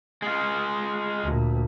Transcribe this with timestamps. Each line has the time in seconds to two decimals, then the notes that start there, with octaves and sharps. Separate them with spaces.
0.22 G#3 F4
1.24 D2 A#2